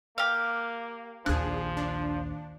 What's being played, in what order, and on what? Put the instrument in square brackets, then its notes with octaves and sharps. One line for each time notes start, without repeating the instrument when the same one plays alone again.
[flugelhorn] A#3 [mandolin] G4 F5
[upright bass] A#1 D#2 [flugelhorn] F3 [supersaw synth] D4 G#4 [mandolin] F#6
[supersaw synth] D4